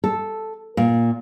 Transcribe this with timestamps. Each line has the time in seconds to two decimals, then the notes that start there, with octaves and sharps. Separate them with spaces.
0.04 A4
0.77 A#2